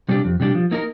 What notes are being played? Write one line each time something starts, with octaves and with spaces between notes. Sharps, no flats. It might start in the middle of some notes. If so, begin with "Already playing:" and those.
C3 G3 D4 G4
F2
C3 G3 D4 G4
F3
A#3 D#4 A#4